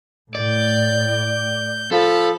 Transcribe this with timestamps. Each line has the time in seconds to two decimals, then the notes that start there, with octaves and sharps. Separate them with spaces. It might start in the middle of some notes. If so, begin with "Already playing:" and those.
0.35 A2 D5 G6
1.92 F3 A4 B5